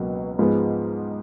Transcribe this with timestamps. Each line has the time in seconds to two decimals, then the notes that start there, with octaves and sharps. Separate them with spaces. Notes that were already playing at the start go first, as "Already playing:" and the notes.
Already playing: C#2 B2 F#3 A#3
0.39 G#2 F3 G#3 B3